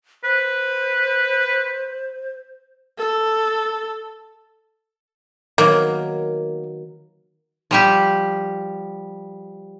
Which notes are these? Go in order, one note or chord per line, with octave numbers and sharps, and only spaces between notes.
B4 C5
A4
D#3 F#3 A#3 B3
F3 G3 G4